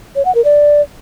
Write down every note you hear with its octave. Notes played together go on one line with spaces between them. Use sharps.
C#5
F#5
A#4
D5